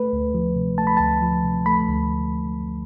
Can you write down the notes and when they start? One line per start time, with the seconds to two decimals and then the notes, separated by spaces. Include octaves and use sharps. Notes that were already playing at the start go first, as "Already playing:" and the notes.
Already playing: A3 B4
0.13 D2
0.34 F3
0.56 C3
0.78 A3 A5
0.87 B5
0.97 D2 A5
1.22 F3
1.44 C3
1.66 A3 B5
1.88 D2